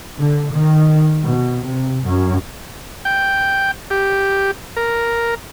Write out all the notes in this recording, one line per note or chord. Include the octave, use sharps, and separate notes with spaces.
D3
D#3
B2
C3
F#2
G5
G4
A#4